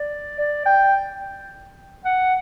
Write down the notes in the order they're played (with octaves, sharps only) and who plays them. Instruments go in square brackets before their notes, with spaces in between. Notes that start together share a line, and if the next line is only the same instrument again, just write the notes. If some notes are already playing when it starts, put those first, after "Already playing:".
Already playing: [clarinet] D5
D5
G5
F#5